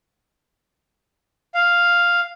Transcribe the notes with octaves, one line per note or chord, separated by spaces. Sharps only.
F5